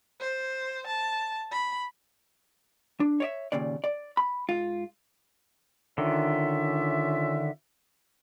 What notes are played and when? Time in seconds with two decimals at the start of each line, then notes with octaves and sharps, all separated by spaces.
0.20 C5
0.87 A5
1.51 B5
3.00 D4
3.20 C#5 D5 E5
3.52 D#2 A#2 C#3 D5
3.84 D5
4.17 B5
4.49 G#2 F4
5.98 D3 D#3 C#4 F4 E5